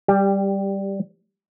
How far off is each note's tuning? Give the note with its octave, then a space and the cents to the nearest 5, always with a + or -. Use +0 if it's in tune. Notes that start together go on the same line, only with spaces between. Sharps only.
G3 +0 G4 +20 A5 +0